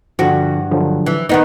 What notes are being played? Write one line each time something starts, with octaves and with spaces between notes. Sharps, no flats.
G2 D3 F3 F#4
D3 F3 F#3
E3
D#3 B3 D#4